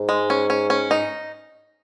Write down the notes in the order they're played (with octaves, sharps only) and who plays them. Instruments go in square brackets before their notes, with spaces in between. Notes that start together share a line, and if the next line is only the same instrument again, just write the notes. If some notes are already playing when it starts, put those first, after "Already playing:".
Already playing: [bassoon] G#2
[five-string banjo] G#3
C#4
C#4
C#4
D#4